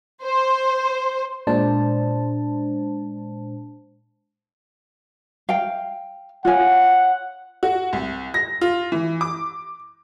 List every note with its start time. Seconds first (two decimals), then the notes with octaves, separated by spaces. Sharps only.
0.23 C5
1.47 A#2 G#3 D4 C5 A5
5.49 F5 G5
6.45 F4 C#5 F#5 G#5
7.63 F#4
7.93 C2
8.34 A#6
8.61 F4
8.92 E3
9.21 D6